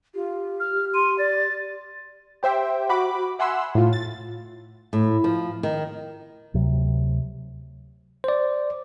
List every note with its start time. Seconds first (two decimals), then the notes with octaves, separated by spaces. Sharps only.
0.14 F4 G4
0.60 F6
0.94 C6 D#7
1.18 D5 A6
2.43 G4 C5 E5 G5
2.89 F#4 B5 D6
3.39 E5 F#5 G#5 B5 C6 E6
3.75 A2 F4
3.93 A6
4.93 A2
5.24 F3
5.63 D#3
6.54 D2 C3 F#3
8.24 C5 D5